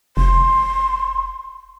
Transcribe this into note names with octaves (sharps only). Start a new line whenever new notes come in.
F1 C6